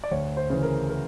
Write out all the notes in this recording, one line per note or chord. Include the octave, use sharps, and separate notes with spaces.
D5
D2 C#5
C5
C#3 E3
A#4
A#4